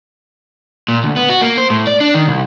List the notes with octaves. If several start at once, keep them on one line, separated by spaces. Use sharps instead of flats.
A#2
D2
B3
F#4
A#3
C5
A2
D5
D4
D#3
C2